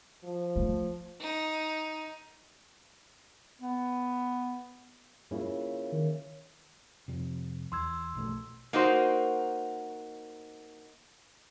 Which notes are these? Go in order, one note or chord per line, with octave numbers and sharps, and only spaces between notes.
F3
A3
D#4
B3
C#3 A#3 E4 F4 E5
D#3
F2 C3
E2 C6 E6 G#6
A#1 B2 A3
A#3 D#4 F#4 C5